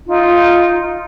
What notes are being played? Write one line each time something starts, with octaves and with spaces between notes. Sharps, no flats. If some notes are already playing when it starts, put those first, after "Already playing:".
D#4 F4